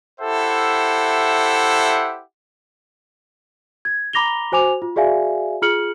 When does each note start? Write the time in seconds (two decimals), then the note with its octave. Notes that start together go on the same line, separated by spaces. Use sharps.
0.20 E4 G4 A4 C5 E5 F#5
3.85 G#6
4.13 A#5 B5 D6 A#6 F7 G7
4.52 F#4 C5 G#5 D6 F7
4.82 F4
4.96 F#4 G#4 D5 E5 F5 G#5
5.62 F4 G#4 F6 C#7 F#7